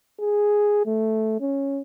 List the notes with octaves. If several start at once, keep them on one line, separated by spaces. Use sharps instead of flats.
G#4
A3
C#4